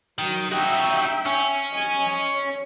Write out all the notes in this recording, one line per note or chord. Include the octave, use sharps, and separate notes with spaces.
D#3 F#3
D#4 F#4 E5 G5
C#4
D#5 G#5
C#5